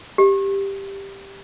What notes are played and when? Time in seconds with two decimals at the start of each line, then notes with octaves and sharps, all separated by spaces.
0.18 G4